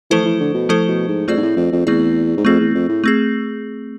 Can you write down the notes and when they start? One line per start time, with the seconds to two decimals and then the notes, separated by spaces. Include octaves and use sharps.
0.11 E3 F3 A3 E4 A4 C5
0.25 E3
0.40 D3
0.54 B2
0.69 F3 A3 E4 A4 C5
0.88 B2
1.08 G#2
1.28 F2 A3 C4 G#4 D5
1.37 G#2
1.43 A2
1.57 F2
1.72 F2
1.87 E2 A3 C4 G#4 D5
2.37 G#2
2.45 F2 A3 C4 G#4
2.60 E2
2.75 F2
2.89 A2
3.04 A3 C4 G#4